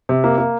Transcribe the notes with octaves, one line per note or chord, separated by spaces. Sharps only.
C3
A#3
A#3